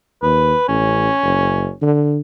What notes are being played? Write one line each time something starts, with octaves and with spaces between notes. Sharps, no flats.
D#2 B4
A1 C#4
F#1
D3